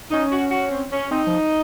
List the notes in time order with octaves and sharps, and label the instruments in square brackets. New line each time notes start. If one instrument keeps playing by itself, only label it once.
[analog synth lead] C#4 [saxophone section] D#4
[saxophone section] F#4
F#4
C4
C#4
[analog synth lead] C4 [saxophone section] D#4
[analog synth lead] F3